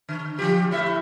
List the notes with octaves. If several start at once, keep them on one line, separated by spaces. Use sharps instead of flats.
D3
F3 F4 G4
A2 E4 E5